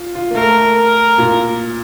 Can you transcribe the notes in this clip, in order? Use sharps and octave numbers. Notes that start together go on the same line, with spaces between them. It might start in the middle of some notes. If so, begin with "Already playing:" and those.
Already playing: F4
F4
A#3
A3 A#4
A#4
A#2